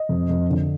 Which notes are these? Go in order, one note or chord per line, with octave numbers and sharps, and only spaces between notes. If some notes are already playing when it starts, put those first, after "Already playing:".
Already playing: D#5
F2
F2
D3